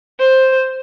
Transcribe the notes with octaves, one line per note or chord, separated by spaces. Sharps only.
C5